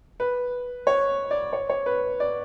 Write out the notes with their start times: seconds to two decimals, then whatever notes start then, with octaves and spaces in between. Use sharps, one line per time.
0.20 B4
0.87 C#5
1.31 D5
1.53 C#5
1.70 C#5
1.86 B4
2.20 D5